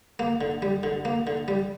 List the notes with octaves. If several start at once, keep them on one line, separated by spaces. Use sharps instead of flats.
A#3
D3
G3
D3
A#3
D3
G3